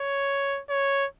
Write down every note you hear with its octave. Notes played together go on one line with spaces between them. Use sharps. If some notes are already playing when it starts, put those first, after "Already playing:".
Already playing: C#5
C#5